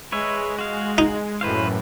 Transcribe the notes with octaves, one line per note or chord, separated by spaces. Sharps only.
G#3 B4 C#5 E5
F#4 F5
D#4
F#2 A2 E3 B4 C5 F5